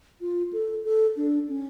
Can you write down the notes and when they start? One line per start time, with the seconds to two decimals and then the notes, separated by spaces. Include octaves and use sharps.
0.21 F4
0.53 A4
0.85 A4
1.17 D4
1.48 C#4